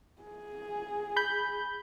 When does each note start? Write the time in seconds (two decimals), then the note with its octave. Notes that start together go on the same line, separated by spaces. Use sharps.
0.22 G#4
1.16 B5 G6